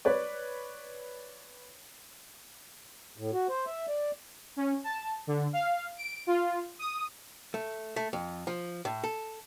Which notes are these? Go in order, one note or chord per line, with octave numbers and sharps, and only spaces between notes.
B4 C#5 D5
A2
F#4
C5
E5
D5
C#4
A5
D3
F5
D7
F4
D#6
A3
A3
F2
F3
A2
A4